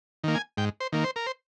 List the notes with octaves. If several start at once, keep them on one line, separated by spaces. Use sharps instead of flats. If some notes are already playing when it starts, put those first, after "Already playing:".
D#3 A#3
G#5
G#2 G5
C5
D#3 A#3
C5
A#4
C5